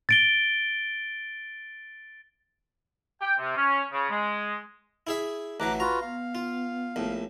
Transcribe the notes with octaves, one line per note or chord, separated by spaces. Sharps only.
A6 D7 G7
G5
C3
C#4
C#3
G#3
E4 G#4 E5
A1 E3 F#3 A#5 D6 F#6
F4 F#4 B4 A#5
B3 F5
F4
A#1 A2